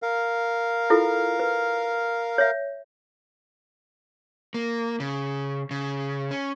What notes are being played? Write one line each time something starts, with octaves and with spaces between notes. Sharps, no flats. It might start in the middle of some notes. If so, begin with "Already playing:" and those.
A#4 F5
E4 F4 A4
B4
C#5 E5
A#3
C#3
C#3
C#4